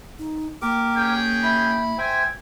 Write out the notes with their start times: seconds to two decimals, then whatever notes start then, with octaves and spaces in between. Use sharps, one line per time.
0.19 D#4
0.62 A#3 G4 A#4 D6
0.96 C#4 G#4 G5
1.43 E4 B5
1.98 C5 E5 G5 G#5